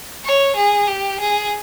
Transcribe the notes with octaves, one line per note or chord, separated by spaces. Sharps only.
C#5
G#4
G4
G#4